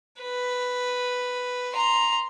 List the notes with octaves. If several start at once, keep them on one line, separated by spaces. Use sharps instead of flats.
B4
A#5 C6